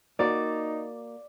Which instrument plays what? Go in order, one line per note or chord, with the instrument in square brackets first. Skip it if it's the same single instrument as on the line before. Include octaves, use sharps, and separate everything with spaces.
[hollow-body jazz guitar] A#3 F#4 [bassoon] D#4 [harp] D5